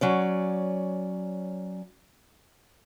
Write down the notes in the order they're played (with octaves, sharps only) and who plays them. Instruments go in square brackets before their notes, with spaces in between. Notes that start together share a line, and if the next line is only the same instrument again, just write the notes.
[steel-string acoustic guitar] F#3 C#4 D5